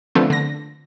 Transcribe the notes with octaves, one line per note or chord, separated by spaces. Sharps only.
D3 F3 A3 B3 C4
D3 A#6